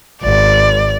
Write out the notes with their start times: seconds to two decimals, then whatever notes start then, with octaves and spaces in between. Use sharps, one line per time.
0.23 G#1 D5